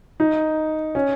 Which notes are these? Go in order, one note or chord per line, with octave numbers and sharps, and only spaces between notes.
D#4
C#4